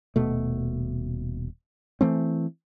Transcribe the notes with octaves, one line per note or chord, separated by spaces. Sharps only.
D#1 B2 A3
E3 A3 C4